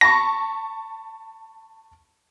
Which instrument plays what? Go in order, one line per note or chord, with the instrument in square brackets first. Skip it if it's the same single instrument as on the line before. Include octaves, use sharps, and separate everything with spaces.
[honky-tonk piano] A5 B5 C#6 [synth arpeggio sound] A#6